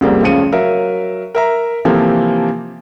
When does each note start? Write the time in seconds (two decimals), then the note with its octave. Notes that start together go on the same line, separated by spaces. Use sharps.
0.01 C2 F2 G3 G#3 A#3 C4
0.22 F1 C#2 C#3 F3 C#7 D#7
0.52 F#3 A#4 E5 F5
1.35 A#4 E5 A#5
1.85 C3 E3 F3 A#3 G4 A4